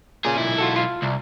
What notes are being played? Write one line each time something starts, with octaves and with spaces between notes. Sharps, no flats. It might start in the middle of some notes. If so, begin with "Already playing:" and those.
A#2 C#4 G#4
B1 E4
F4 F#4 A4
F4 F5
C2